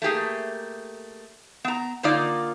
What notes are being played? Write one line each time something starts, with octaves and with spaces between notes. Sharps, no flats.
A3 A#3 G4 G#4
B3 A#5
D3 A#3 D#4 F4 D5